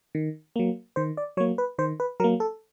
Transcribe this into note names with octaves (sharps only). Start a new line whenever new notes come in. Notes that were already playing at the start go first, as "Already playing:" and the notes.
D#3
F#3 A#3
D#3 C5
D5
F#3 A#3 C#5
B4
D#3 C5
B4
F#3 A#3 A#4
A4